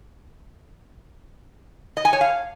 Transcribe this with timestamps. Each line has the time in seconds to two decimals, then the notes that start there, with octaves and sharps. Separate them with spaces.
1.97 D#5
2.05 G#5
2.13 C#5
2.21 F5